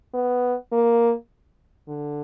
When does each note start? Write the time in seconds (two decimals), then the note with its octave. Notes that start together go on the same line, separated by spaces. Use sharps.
0.14 B3
0.72 A#3
1.88 D3